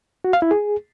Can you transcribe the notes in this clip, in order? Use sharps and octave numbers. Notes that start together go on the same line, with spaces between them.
F#4
F5
E4
G#4